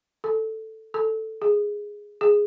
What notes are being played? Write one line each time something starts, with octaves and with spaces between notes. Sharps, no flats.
A4
A4
G#4
G#4